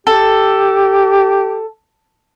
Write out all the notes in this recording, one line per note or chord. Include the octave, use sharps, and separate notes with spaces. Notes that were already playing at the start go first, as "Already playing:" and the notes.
G4 A4